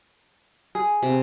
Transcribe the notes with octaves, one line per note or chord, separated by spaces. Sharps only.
G#4
C3